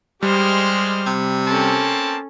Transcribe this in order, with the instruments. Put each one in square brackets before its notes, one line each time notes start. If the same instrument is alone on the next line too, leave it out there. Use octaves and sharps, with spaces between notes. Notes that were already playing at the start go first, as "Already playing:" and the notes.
[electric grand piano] G3 [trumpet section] G#3 [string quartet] G4 C5 F6
[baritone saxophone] C3
[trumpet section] A#3 C4 A5 [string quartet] C#4 A4